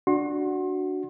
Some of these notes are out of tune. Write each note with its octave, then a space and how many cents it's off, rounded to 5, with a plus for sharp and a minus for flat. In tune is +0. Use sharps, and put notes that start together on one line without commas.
D4 +0 F#4 +0 C6 +35